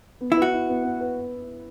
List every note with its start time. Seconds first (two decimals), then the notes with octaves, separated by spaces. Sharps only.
0.21 B3
0.32 E4
0.37 F#4 B4
0.53 E4
0.69 B3
0.84 B3
1.01 B4